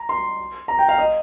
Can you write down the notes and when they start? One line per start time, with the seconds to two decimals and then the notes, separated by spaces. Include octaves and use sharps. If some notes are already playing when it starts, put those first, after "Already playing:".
Already playing: A#5
0.09 C6
0.68 A#5
0.79 G5
0.89 F5
0.98 D#5